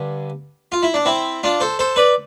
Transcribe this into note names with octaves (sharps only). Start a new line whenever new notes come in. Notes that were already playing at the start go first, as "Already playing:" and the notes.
Already playing: G2 D3
F4
E4
D4
C4 E4
D4 F4
A4 C5
A4 C5
B4 D5